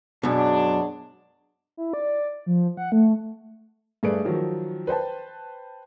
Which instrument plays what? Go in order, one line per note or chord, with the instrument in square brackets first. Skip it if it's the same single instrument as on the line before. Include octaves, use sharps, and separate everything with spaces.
[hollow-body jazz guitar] F#2 B2 [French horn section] F#3 G#3 D4
[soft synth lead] E4
D5
F3
F#5
A3
[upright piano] G2 A3 G#4 B4 D5 D7
D#3 F3 F#3
B4 C5 G5 A5